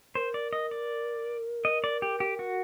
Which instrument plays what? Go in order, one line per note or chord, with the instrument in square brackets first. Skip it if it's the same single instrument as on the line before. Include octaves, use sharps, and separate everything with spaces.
[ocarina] A#4 [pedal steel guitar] C5
[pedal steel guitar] D5
D#5
D5
D#5
D5
G4
G4
F#4